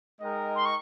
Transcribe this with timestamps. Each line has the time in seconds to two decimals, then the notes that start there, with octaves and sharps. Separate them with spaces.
0.21 G#3 D#4 A#4 D#5 G5
0.56 C6
0.65 C#6